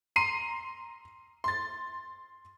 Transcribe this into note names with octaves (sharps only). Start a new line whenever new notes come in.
A#5 C6 C7 D#7
C6 A6